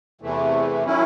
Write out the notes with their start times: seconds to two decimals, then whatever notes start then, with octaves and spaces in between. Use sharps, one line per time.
0.21 E2 C3 E3 A3
0.84 D#3 F#3 C#4 E4